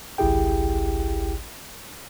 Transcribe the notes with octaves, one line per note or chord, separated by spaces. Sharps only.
G#1 C#2 E4 G4 G#4 G5